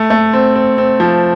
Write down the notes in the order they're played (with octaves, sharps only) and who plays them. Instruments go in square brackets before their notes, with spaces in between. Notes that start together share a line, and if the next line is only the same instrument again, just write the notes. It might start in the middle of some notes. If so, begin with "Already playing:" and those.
Already playing: [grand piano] A3
A3
C4
C4
C4
F3